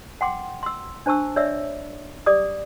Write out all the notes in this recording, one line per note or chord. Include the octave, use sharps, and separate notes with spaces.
F#5 G5 C6 D6
C6 E6
D4 C5 A5 C#6 E6
C#5 D5 E5 E6
G4 D5 D6 D#6